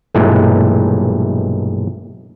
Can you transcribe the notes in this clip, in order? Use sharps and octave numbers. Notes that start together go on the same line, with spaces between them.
B1 G2 A#2 E3 G#3 A3